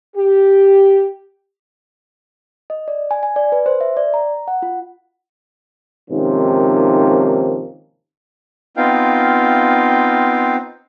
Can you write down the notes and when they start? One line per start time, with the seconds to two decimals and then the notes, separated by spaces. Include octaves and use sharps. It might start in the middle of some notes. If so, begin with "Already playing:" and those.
0.16 G4
2.70 D#5
2.88 D5
3.11 G#5
3.23 G#5
3.36 D5
3.52 B4
3.66 C5
3.81 E5
3.97 D5
4.14 A#5
4.48 F#5
4.62 F4
6.10 G#2 C3 D#3 F3 A#3 C#4
8.77 B3 C4 D#4 F4 F5 G5